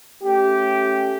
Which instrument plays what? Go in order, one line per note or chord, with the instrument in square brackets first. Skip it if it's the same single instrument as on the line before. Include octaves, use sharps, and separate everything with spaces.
[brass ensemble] A3 C#4 G4